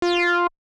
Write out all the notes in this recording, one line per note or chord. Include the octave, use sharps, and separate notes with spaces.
F4